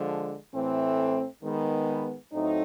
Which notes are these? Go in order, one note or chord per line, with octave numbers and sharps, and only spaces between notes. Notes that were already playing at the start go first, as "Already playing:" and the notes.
Already playing: D3 F3 G#3
A2 E3 A3 C4
D#3 G#3 B3
A2 F#3 A3 C4 D#4